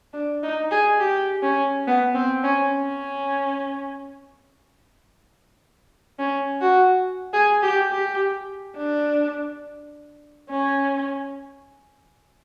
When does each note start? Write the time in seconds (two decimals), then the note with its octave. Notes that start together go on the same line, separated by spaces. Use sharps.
0.14 D4
0.43 D#4
0.72 G#4
1.00 G4
1.43 C#4
1.87 B3
2.15 C4
2.44 C#4
2.73 C#4
6.19 C#4
6.61 F#4
7.33 G#4
7.63 G4
7.92 G4
8.78 D4
10.50 C#4